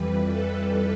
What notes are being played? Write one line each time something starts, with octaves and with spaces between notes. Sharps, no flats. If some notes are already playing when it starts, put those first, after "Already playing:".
Already playing: F2 E3 G3 B4
A4